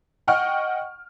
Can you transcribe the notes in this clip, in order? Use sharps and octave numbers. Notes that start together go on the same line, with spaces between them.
D#5 F#5 G5 C#6 F6